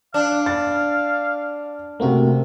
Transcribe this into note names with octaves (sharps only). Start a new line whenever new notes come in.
D4 F5
A6
C3 A3 A#3 C4 F#4